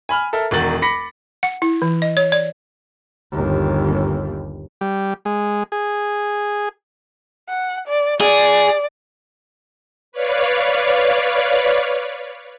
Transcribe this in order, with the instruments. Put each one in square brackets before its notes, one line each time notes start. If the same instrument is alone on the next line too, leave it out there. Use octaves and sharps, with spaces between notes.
[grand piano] G#5 B5 F6
A4 A#4 E5
E1 E2 D#3 F#4 A6 F#7
B5 D6 A#6 B6 C#7
[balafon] F#5
E4
E3
D#5
C#5
D5
[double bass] G1 D#2
[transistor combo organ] G3
G#3
G#4
[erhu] F#5
D5
[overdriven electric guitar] G#4 [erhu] D5
[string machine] B4 C#5 D5 F5